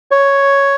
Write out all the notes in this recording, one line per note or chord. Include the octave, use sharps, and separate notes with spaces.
C#5